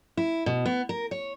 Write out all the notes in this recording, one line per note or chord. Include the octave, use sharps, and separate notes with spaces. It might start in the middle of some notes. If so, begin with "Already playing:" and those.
E4
B2
B3
A#4
C#5